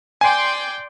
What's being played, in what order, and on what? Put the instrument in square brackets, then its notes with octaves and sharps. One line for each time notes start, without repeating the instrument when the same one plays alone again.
[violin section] D5 G5 C6 [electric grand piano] G#5